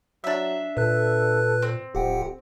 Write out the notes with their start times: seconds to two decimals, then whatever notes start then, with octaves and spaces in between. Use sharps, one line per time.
0.24 F#3 D4 E5
0.77 A#2 A4 B4 F#6
1.62 C4
1.95 D1 F2 G4 F#5 G5